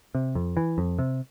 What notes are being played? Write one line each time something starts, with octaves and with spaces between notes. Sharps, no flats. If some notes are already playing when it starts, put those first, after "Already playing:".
C3
F2
E3
F2
C3